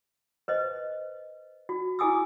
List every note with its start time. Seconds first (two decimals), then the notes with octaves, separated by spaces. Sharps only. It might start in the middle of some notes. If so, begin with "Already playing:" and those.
0.48 B4 C5 D#5
1.69 F#4
1.99 E4 G#4 G#5 D#6 E6